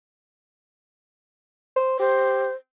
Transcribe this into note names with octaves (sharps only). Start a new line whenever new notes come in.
C5
G4 C5